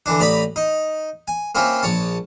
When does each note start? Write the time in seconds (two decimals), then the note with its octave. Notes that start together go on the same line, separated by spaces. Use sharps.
0.06 D3 E3 D4
0.20 A1 D5 A#5 B5 D#6
0.56 D#4
1.28 G#5
1.55 A#3 C4 C#4 E4 F4
1.83 A#1 C#5 A5